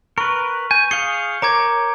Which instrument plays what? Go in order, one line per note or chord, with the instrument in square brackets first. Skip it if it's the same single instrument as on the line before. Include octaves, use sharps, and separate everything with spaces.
[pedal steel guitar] A#4 B4 [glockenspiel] C#6
[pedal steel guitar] G#5 [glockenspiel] G6
[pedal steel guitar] G#4 F5 D#6 [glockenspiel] C#7 G7
[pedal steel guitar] A#4 C#5 [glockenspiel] A#5 D6 G#6